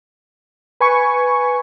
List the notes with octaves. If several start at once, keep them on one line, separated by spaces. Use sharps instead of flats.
B4 G#5 C#6